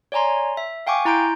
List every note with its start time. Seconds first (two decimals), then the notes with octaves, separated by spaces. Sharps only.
0.12 C#5 D5 G#5 A#5 C6
0.57 E5
0.87 F5 G5 G#5 C#6 D6
1.05 E4 A#5 C6 G6 D7